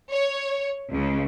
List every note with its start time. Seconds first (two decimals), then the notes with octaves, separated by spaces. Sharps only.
0.12 C#5
0.92 C#2 C#3